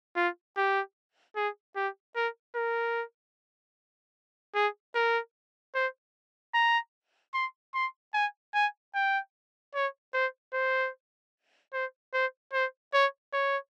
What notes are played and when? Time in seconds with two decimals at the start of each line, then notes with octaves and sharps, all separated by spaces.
0.16 F4
0.57 G4
1.36 G#4
1.76 G4
2.16 A#4
2.55 A#4
4.55 G#4
4.95 A#4
5.75 C5
6.54 A#5
7.34 C6
7.74 C6
8.14 G#5
8.54 G#5
8.95 G5
9.75 C#5
10.14 C5
10.53 C5
11.73 C5
12.14 C5
12.53 C5
12.94 C#5
13.33 C#5